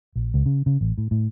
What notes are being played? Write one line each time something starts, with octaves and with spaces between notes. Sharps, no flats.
A#1
C#2
C#3
C#3
A1
A2
A2